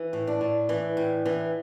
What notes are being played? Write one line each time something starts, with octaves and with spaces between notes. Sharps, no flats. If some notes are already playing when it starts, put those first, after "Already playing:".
Already playing: E3
A2
D4
A2
E3
A2
E3